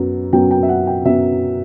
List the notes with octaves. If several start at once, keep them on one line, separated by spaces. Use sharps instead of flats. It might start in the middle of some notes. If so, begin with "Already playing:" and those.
Already playing: F#2 F#3 B3
F#2 F#3 B3 G5
G5
E5
F#5
G5
F#2 F#3 B3 E5